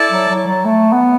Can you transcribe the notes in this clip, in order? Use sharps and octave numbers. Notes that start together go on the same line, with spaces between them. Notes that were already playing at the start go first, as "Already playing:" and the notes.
Already playing: E4 A4 D5 A5
F#3
F#3
F#3
A3
B3